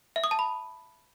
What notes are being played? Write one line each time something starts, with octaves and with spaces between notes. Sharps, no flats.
E5
D#6
A5
B5